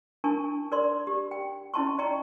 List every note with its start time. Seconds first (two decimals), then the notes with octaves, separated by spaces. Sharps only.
0.24 D4 E4 A#4 G#5 A5 C#6
0.72 A#4 D5 C6
1.07 G4
1.31 G5
1.74 C#4 E4 D#5 A5 C6 C#6
1.98 D5 D#5 G5 A#5 C#6